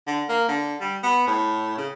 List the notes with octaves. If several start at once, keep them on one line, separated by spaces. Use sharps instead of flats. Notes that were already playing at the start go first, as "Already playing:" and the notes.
D3
A#3
D3
G3
B3
A2
C#3